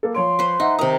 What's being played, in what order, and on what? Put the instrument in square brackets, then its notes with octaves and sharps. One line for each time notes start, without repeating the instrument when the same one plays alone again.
[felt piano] A#3 A4
[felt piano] F3 C#5 D7 [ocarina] C6
[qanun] B4 C5
[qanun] D#4 [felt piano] D#5 E5 F#5
[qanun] C3 A#5 [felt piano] D#3 D#6 [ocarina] A#4